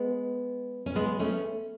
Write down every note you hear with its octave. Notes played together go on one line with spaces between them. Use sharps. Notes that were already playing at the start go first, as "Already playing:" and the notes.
Already playing: G#3 B3
C#4
G#3 B3
A3 C#4